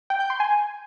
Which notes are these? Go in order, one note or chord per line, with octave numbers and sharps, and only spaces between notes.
G5
G6
C6
G#5